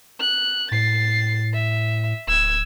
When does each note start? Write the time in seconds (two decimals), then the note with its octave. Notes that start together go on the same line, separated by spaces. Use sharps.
0.19 F#6
0.71 A2 A6 C7
1.53 E5
2.27 D1 E6 G#6